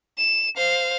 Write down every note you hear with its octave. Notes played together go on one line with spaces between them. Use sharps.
E7
C5 F5